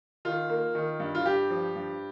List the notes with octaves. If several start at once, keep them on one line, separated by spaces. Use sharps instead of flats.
D#3 F4
A#3
D#3
G2
F4
G2 G4
F3
G2